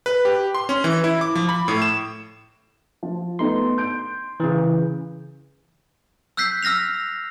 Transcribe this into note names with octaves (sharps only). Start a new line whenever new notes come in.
B4
G4
C6
C#4
E3
E4
D6
F3
B5
A2
E7
F3
A3 B3 D#4 C6
G6 D7
C#3 E3
E6 F#6 G6 B6 C7
E6 F6 A#6 B6 F7